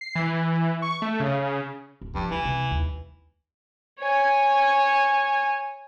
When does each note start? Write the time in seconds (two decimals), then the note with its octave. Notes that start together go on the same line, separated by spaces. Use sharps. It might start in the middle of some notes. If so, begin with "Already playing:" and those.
0.01 C7
0.15 E3
0.82 C#6
1.02 A3
1.20 C#3
2.01 D1
2.15 G2 F3
2.31 D2 E3
2.45 C3
2.71 D#2
4.00 C#5 G#5